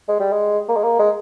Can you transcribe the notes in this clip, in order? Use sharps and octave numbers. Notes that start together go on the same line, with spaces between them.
G#3
G3
G#3
A#3
G#3
A#3
G#3